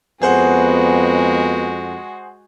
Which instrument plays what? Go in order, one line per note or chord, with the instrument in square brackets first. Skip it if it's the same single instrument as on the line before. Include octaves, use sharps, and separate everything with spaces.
[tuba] F2 [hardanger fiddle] G#3 F#4 [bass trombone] B3 [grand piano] G#4 C5 F#5